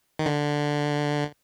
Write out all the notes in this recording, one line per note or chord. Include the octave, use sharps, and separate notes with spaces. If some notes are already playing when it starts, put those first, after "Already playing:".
D#3
D3